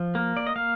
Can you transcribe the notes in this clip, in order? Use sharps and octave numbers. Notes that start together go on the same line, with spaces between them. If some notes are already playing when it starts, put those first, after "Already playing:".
Already playing: F3
A#3
D5
D#5
A#3 F5